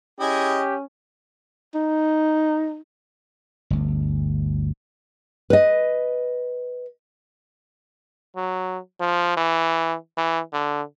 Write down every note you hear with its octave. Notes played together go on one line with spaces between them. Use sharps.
C#4 E4 G4 G#4 D#5
D#4
G1 D2
B4 D#5
F#3
F3
E3
E3
D3